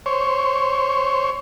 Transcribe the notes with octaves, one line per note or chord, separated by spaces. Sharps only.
C5 C#5